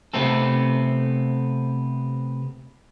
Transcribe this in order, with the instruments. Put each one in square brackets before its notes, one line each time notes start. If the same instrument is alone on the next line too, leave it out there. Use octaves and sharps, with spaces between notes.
[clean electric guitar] C3 A3 B3 C4 A4